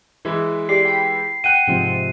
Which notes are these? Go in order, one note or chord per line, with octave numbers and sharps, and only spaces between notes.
E3 G#3 E4
G4 D5 C7
G5 B5
F#5 G5 F#6 D#7
G#2 C3 F3